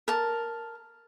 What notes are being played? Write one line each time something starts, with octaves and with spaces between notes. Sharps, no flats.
A#4 A5